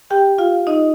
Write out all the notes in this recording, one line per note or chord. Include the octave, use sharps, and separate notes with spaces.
G4 G5
F4 F5
D#4 D#5